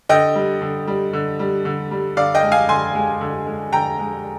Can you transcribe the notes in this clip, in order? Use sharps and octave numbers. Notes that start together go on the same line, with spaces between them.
D3 D#5 G5
G3
D3
G3
D3
G3
D3
G3
D3 D5 F5
D#5 G5
G#3
F5 G#5
D3 G#5 C6
G#3
D3
G#3
D3 G5 A#5
G#3